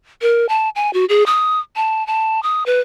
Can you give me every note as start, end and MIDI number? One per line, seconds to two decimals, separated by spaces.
0.22 0.46 70
0.49 0.69 81
0.76 0.93 80
0.94 1.05 66
1.09 1.26 68
1.26 1.59 87
1.76 2.06 81
2.07 2.42 81
2.43 2.64 87
2.66 2.81 71